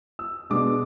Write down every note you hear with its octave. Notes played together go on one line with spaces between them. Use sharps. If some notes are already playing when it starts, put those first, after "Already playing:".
E6
B2 G#3 D4 D6